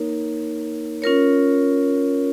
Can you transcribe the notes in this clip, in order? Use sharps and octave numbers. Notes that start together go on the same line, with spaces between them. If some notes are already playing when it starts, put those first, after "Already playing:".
Already playing: A#3 D#4 A#4 C#5
C#4 F4 A#4 C#5